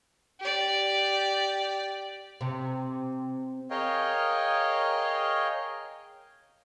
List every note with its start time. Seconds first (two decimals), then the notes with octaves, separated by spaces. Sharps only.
0.40 G4 D5
2.41 C3
3.70 G#4 A#4 C#5 D#5 F5 G5